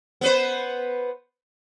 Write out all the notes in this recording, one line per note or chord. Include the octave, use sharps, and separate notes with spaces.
B3 B4 C5